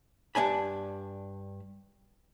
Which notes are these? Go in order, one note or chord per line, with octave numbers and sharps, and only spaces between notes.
G2 D4 G#5 B5